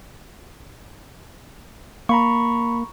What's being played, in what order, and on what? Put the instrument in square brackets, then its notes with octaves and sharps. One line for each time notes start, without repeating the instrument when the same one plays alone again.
[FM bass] A#3 [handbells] A#5 B5 C#6